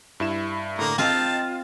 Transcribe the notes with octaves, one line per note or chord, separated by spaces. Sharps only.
G2 E4 E7
A2 D3 A#3 A#5
C4 F4 D#5 F5 G5 A5